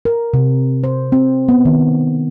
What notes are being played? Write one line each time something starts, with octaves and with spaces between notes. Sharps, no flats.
A#4
C3
C5
C4
B3
D#3